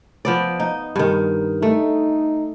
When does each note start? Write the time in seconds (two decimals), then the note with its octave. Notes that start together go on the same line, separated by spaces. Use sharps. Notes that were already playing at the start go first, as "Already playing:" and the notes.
0.25 F3 B3 D5
0.60 D#4
0.96 G2 D#3
1.62 A3 D#4